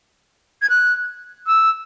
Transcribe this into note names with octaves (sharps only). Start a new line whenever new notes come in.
G#6
F#6
E6